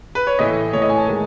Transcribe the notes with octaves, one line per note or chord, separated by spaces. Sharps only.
B4
C#5
A2 E3 A3 E4 D#5
A2 E3 A3 E4 C#5
D#5
G#5
A5
D#3 G#3